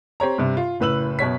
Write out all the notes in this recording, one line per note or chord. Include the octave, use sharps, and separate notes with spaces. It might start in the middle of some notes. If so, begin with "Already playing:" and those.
C4 G4 C#5 A#5
G2 C3
F4
F#1 A2 B4 E6 F#7
F#2 B2 C#5 B6